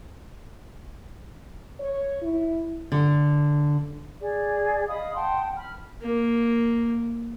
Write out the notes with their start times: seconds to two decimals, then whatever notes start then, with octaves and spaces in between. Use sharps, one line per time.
1.80 C#5
2.22 E4
2.92 D3
4.21 G#4 D5
4.88 D#5 F5 B5 D#6
5.15 F#5 G5 A5 C6
5.56 B5 F6
6.02 A#3